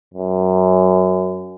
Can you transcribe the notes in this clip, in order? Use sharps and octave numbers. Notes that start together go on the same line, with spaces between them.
F#2